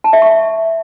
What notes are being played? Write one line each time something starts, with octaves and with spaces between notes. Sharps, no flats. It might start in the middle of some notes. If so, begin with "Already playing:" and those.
A5
E5
C#6
E5